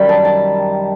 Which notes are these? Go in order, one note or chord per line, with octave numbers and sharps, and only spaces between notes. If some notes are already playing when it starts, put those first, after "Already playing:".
Already playing: F#2 D#3 G3 B5
A5
A5